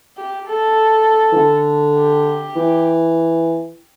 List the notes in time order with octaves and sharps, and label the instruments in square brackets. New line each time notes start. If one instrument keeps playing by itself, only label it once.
[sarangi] G4
A4
[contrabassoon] E3
D3
[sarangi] G4
[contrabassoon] E3